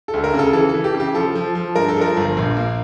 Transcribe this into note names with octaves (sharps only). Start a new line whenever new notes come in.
A4
D2
A#4
C#3
A4
E3 A4
E3 A4
G4
C#3
G4
F3 A4
F3
F3
G2 A#4
A4
F3 A#4
G1
A#1
A#3